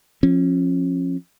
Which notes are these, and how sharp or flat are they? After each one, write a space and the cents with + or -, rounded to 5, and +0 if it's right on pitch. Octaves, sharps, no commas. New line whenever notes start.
F3 +0 C#4 -30